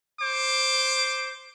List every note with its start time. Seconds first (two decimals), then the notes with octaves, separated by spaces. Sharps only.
0.21 C5 D6